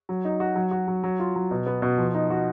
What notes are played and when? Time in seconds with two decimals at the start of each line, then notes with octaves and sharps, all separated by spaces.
0.09 F#3
0.25 D#4
0.40 F#4
0.56 F#3
0.71 F#4
0.88 F#3
1.04 F#3
1.20 F4
1.36 F#3
1.51 B2
1.67 B3
1.82 B2
1.98 F3
2.14 D#4
2.30 F#4